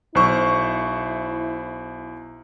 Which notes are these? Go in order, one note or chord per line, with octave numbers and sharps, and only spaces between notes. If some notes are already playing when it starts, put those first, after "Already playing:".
B1 E4 C5 C#6